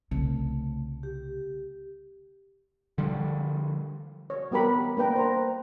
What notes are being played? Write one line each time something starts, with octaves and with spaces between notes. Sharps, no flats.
C2 C#3 A3
G4
D3 F3 G3
C#5
G3 B3 G4 A#4 B5
A#3 D4 B4 G5 A#5
C5 A#5